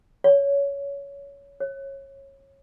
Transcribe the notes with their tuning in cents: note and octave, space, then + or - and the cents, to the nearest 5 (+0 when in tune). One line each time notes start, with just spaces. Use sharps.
C#5 +20
C#5 -20